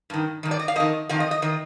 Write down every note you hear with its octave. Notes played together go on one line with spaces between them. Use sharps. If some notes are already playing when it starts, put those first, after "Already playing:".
G2 D#3
G2 D#3
D5
D#5
F5
F2 D#3 D#5
F2 D#3 F5
D#5
D#5
D#3 D#5